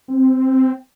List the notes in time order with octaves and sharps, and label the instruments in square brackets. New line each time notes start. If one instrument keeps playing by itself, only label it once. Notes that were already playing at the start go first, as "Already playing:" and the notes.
[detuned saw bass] C4